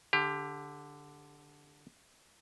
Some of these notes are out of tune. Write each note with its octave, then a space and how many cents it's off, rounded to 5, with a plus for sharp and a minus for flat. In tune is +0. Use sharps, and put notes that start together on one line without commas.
D3 +0 G4 +25